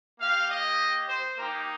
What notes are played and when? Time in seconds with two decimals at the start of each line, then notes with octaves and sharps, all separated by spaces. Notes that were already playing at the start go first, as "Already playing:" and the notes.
0.20 A#3 G4 F5
0.49 D#5
1.08 C5
1.38 A#3 D#4 G4 A#4